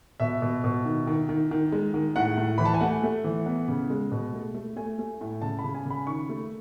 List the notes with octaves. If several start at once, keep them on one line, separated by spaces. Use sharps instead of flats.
B2 E5
B2
B2
D#3
D#3
D#3
D#3
G#3
D#3
A2 F#5
A2
E3 B5
A5
G#5
A3 F#5
A3
E3
B3
C#3
G#3
B2
A3
A3
A3 G#5
A3
A2
C#3 A5
B5
C#3
G#5
C#3 B5
D#3 C#6
A3